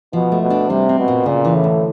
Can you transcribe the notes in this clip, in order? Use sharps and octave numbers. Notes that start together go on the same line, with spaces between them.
B2 F3
A3
B2
D4
C3 G3
C4
B2
A#2
A#2 C#3
E3
A2
D2